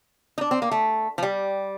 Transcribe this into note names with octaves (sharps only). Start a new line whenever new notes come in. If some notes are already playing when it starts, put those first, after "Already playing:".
D#4
D4
C4
A#3
A3
F3
G3